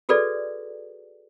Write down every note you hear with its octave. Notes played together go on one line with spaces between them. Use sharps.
F#4 G#4 A4 B4 D5